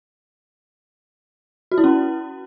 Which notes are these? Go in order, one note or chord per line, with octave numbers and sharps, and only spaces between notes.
F#4
E4
C#4